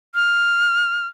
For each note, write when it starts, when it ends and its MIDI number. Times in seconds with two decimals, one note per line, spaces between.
0.15 1.07 89